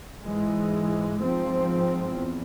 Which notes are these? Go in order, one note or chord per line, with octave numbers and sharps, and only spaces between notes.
G#2 E3 G#3
G#2 F3 C4
E2